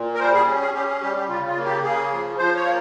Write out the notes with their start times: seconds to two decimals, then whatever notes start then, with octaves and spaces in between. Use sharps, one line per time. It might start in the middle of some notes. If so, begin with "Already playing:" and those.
Already playing: A#2
0.14 A#4
0.20 G3 C5
0.33 G#4
0.47 C#4
0.61 G#4
0.74 C#4 G4
0.88 G#4
1.02 G3 G4
1.15 G4
1.28 C#3 F4
1.47 F4
1.56 A#3
1.65 G4
1.83 C#3 G#4
2.11 F3
2.38 F3 C5
2.56 C#5
2.65 A#3